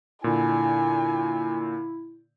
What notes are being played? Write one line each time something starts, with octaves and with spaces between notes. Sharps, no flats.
A#2 D3 E4 G#5